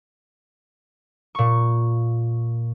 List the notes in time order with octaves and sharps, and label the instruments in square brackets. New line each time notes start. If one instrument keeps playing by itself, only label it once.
[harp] A#2 C#6